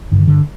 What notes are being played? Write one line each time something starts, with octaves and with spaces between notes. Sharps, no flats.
G2 D3 D#3
D3